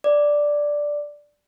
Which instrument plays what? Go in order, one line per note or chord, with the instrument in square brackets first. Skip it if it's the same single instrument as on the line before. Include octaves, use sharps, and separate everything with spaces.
[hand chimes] D5